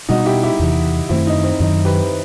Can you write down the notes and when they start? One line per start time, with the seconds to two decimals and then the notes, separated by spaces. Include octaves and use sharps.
0.09 B2 G3 B3 D#4 F#4
0.25 E4 G4
0.43 E4 G4
0.59 E2 C3 E3
1.09 F#2 D#3 A3 C4 E4
1.27 D#4
1.44 C4
1.60 F#2 D#3 F#3 D#4
1.85 G4 B4